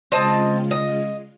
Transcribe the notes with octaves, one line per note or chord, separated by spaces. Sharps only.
C#3 G#3 C4 F4 D#5 A5
D#5